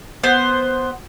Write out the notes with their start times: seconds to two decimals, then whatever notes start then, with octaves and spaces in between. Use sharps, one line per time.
0.23 B3 C5